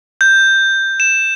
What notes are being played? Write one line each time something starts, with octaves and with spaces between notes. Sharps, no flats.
G6
E7